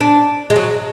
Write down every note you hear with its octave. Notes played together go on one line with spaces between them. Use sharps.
D4
G#3
F#3